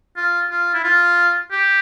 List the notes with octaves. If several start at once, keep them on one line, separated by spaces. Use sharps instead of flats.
F4
F4
E4
F4
G4